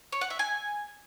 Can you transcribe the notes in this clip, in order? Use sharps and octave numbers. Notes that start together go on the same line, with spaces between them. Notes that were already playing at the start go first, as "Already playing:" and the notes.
C#5
F#5
E5
G#5